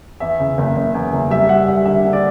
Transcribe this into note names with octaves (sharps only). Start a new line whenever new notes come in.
E2 E5
C#3
F#1
F#1
E2
F#1
G3 E5
G3 F#5
G3 E5
D3 E5
D3
D5